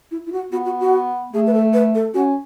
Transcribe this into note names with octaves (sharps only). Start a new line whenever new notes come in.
E4
E4
F#4
B3 F#4
F#4
F#4
A3 G#4
B4
A4
B4
A4
C#4 F#4